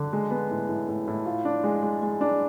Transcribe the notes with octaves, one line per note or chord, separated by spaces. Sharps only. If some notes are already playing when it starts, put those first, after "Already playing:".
Already playing: D3
G#3
B3
A2
A2
A2
A2
F4
D4
G#3
G#3
G#3
D4